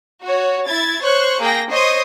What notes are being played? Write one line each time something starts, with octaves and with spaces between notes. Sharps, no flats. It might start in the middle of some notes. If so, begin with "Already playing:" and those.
F#4 C#5
E4 G#6 A6
C5 C#5 C#6 F#6
A#3 G#4 G5 A#6
C5 C#5 D#5 C6 D#6